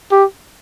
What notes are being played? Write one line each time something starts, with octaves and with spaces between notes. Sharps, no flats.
G4